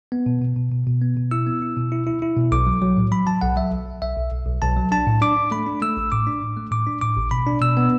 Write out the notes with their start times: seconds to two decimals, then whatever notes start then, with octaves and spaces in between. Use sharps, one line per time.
0.12 B3
0.26 B2
0.42 B2
0.57 B2
0.72 B2
0.87 B2
1.01 B3
1.17 B2
1.31 E4 E6
1.46 B3
1.62 E4
1.77 B2
1.92 E4
2.07 E4
2.22 E4
2.37 B2
2.52 B1 D6
2.67 F#3
2.82 F#3
2.97 A2
3.12 F#3 B5
3.27 F#3 A5
3.41 B1 F#5
3.57 F#3 E5
3.72 B1
3.86 B1
4.02 B1 E5
4.17 B1
4.31 B1
4.46 B1
4.62 B1 A5
4.77 F#3
4.92 D4 A5
5.07 A2
5.22 D4 D6
5.37 D4
5.51 A3 B5
5.66 D4
5.82 A3 E6
5.97 A1
6.12 A2 D6
6.27 D4
6.41 A2
6.57 A3
6.71 A2 D6
6.87 D4
7.01 A2 D6
7.17 A1
7.31 B2 B5
7.47 D4
7.61 B2 E6
7.77 B3